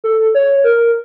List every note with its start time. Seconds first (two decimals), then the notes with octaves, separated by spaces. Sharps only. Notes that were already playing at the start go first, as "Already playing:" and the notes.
0.04 A4
0.35 C#5
0.64 A#4